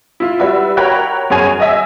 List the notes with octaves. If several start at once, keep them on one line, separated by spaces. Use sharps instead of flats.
E4 F4
G3 F#4 B4 E5
F#4 A#4 C#5 G5 B5 F#6
F#2 G#4 C#5 G#5
D#5 E5 G#5